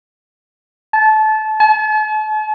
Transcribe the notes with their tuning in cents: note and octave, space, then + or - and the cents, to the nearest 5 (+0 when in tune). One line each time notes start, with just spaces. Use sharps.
A5 -25
A5 -45